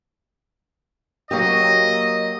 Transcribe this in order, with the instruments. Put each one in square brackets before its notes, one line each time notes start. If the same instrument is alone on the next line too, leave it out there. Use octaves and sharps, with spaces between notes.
[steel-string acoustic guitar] F#3 A#3 G4 [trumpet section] D#5